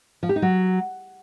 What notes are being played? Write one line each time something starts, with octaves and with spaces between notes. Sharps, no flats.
F3
G4
D#4
F#3